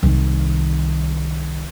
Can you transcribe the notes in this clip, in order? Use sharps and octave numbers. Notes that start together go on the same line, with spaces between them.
C2 D#3